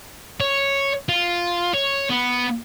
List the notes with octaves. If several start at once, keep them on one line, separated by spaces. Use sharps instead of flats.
C#5
F4
C#5
B3